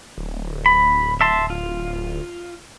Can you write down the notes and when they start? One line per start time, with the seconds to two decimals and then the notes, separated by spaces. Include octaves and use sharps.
0.18 D1
0.66 B5
1.21 E5 A5 C6
1.50 F4